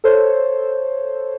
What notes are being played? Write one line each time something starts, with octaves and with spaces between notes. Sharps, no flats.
A4 C5 C#5